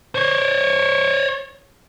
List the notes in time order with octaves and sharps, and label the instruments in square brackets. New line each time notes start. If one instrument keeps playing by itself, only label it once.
[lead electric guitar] C5 C#5